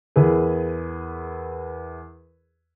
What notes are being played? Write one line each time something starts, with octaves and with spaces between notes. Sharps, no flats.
E2 E4 G#4 A#4 B4